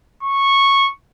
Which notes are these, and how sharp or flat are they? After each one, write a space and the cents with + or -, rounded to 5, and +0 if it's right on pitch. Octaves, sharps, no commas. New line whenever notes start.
C#6 -10